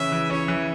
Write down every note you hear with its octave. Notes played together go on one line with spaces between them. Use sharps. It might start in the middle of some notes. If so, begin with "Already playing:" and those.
Already playing: C#3 E3 C#4 E4 E5
E3
C#4 C#5
E3